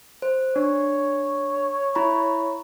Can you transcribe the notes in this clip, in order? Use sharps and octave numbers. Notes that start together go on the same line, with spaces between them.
C5
D4 C#5
E4 A#5 B5